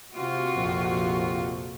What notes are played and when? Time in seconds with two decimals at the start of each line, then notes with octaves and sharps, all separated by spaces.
0.13 C3 F4 F#4
0.54 A#1 F2